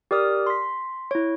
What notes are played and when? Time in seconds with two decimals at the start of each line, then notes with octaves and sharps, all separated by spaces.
0.11 G4 A#4 D5 D#6 F6
0.47 C6 B6
1.11 E4 C#5